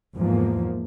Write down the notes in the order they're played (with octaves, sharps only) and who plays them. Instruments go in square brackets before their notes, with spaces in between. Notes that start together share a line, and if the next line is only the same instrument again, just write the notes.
[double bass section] E2 G#2 F3 A#3